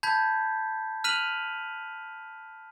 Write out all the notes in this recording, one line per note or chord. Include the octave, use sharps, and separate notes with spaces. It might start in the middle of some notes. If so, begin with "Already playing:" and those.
A5 B5 G6 G#6 B6
F6 F#6 B6 D#7 F7 F#7